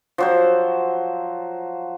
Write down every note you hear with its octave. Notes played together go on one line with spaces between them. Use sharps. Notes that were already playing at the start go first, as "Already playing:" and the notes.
F3 F#3 C5